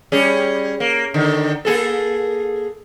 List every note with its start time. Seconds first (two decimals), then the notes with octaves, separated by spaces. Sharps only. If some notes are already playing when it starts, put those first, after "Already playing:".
0.12 G3 C#4 G#4
0.80 A#3
1.14 D3 D#3
1.65 A#3 G#4 A4